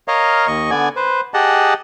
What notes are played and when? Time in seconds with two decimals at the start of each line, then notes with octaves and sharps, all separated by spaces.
0.08 A#4 C#5 D#5 F5
0.47 D#2 D#5 C#6
0.71 D3 B3 D5 G#5
0.96 B4 C5
1.34 G4 G#4 D#5 F#5 A5